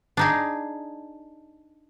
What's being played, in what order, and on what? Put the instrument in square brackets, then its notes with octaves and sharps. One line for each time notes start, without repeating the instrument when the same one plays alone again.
[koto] D4 D#4 G#4